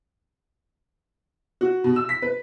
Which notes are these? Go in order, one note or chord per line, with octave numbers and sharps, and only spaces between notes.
F#4
B2
E6
B6
B4